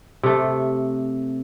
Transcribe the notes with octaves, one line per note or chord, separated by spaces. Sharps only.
C3 A3